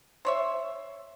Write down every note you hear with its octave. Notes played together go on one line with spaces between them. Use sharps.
C5 C#5 E5